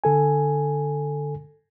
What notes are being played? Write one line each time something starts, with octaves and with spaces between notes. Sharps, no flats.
D3 A4 G#5